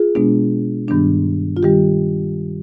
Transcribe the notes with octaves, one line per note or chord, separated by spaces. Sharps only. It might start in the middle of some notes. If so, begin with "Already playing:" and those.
Already playing: F4 G#4
B2 G#3 B3 D4
G2 D#3 G3 B3 D4
F4
D#3 G3 G4